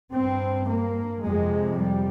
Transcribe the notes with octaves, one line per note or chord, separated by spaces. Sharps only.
G2 C4
A#3
F2 C3 G#3
G3